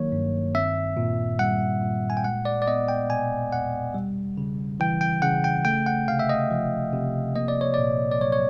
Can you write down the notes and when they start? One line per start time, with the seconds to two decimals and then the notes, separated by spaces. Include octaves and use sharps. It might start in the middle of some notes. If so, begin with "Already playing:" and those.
Already playing: D#3 F#3 A#3 C#5
0.12 G2
0.55 C4 E5
0.97 A#2
1.39 G3 F#5
1.82 A#2
2.10 G#5
2.17 G5
2.24 G#3 F#5
2.45 D5
2.62 D5
2.67 B3 D#5
2.88 G5
3.10 B2 G#5
3.53 E2 F#5
3.95 G3
4.38 C#3
4.80 E3 G5
5.01 G5
5.22 C#3 F#5
5.44 G5
5.65 A3 G5
5.86 F#5
6.08 C3 F5
6.19 E5
6.29 D#5
6.51 F3
6.93 C3
7.36 A#3 D#5
7.48 D5
7.61 C#5
7.74 A#2 D5
8.11 D5
8.21 F#3 C#5
8.32 C#5